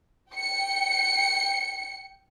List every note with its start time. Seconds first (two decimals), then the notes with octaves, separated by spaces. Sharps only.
0.32 G5 C#7